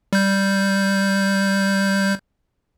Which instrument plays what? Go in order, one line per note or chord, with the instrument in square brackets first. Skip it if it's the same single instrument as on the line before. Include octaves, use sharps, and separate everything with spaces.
[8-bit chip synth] G3 G6